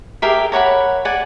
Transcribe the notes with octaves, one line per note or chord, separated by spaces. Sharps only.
G4 G#4 A#4 E5
A#4 C#5 F#5 B5
D5 F#5 G#5